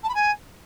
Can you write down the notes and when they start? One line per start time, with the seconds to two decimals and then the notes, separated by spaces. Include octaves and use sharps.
0.03 A5
0.09 B5
0.15 G#5